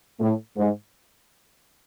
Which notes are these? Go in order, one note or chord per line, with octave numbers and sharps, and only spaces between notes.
A2
G#2